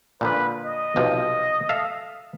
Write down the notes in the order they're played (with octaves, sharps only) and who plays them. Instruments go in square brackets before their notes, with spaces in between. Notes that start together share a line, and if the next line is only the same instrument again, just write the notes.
[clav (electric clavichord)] A#2 D3 F3 [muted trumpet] B4
[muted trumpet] D#5
[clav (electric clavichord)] B1 C3 F3
A4 E5 F5